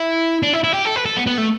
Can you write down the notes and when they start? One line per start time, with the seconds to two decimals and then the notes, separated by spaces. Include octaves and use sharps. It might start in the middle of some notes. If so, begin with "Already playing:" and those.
Already playing: E4
0.43 D4
0.53 E4
0.64 E4
0.74 G4
0.85 A4
0.96 B4
1.06 A4
1.17 B3
1.27 B3
1.38 A3